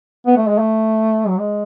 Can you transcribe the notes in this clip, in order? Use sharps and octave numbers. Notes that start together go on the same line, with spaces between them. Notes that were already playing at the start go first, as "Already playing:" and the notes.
B3
A3
G#3
A3
F#3
G#3